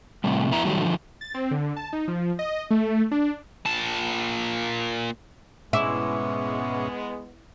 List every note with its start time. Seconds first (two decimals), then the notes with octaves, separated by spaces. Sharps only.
0.24 A2 C3 G3
0.51 F2 B3 E4 A#5
0.65 D#3 F#3 G3 A3
0.82 D3 F3
1.21 A6
1.34 C4
1.51 D3
1.76 A5
1.93 D#4
2.08 F3
2.39 D#5
2.71 A3
3.11 D4
3.66 A#2 A5
5.73 G#2 B2 G#3 B3 C#4 E4 E5 D6